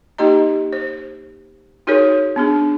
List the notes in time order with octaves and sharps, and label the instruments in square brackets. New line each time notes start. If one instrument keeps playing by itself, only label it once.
[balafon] A#3 D#4 G4 D#5 A#5
C5
D#4 F#4 G#4 A#4 C#5
B3 D4 G#4